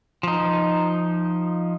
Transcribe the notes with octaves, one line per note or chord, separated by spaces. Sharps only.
F3 D#4